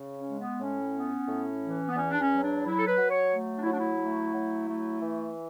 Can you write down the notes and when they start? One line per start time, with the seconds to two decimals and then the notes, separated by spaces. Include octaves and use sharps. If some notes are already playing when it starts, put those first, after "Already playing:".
Already playing: C#3
0.15 C#4
0.27 G#3
0.37 B3
0.61 A2 C#4
0.94 B3
1.29 A2
1.63 E3
1.88 B3
1.96 E2 C#4
2.10 D4
2.19 C#4
2.31 F#3
2.42 D4
2.64 F#3 E4
2.77 A4
2.87 B4
2.98 F#3
3.10 C#5
3.32 A3
3.56 D4
3.62 E4
3.66 F#3 D4
3.78 E4
4.00 A3
4.34 F#3
4.69 A3
5.02 E3